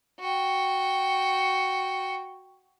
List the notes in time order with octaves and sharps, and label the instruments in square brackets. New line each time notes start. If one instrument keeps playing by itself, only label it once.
[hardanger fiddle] F#4 G5